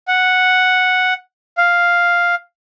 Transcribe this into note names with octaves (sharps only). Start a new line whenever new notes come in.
F#5
F5